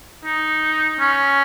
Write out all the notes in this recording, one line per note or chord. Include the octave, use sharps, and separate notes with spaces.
D#4
C#4